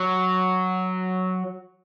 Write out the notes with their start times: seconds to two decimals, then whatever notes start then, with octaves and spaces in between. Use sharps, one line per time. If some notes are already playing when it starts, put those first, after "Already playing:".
Already playing: F#3